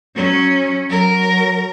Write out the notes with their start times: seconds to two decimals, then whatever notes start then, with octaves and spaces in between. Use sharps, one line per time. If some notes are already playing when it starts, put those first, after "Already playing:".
0.15 F#3 C#4
0.90 F#3 A#4